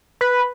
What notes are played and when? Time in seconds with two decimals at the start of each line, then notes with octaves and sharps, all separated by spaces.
0.21 B4